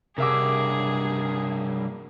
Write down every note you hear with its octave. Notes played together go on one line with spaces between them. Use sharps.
G2 C3 A#3 G#4 A#4 E5 F#5 D6